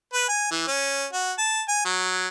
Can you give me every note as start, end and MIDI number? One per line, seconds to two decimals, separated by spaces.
0.13 0.24 71
0.29 0.48 80
0.51 0.66 52
0.67 1.06 61
1.13 1.33 66
1.38 1.62 81
1.68 1.83 80
1.85 2.27 54